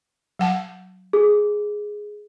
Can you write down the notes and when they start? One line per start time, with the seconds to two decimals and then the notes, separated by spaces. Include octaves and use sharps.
0.39 F#3 F#5 A5
1.13 G#4